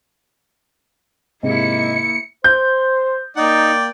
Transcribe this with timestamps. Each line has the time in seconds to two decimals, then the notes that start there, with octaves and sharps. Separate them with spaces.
1.43 G#2 C3 A#3 E4 D#5 C#7
2.44 C5 G6
3.37 A#3 D#4 D5 G5